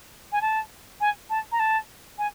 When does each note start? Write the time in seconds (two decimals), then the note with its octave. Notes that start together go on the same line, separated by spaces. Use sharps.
0.32 G#5
0.41 A5
1.00 G#5
1.29 A5
1.52 A#5
1.59 A5
2.18 G#5